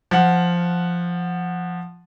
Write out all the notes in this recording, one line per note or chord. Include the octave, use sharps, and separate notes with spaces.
F3 F#5